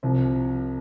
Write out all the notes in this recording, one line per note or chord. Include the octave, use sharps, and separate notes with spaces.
C2 C3 F3